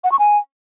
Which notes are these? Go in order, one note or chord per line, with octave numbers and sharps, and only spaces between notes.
F#5
C#6
G#5